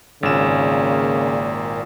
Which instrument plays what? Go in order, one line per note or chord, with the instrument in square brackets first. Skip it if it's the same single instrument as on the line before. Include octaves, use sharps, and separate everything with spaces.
[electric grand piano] G#1 E7 [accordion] A#2 [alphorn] C#3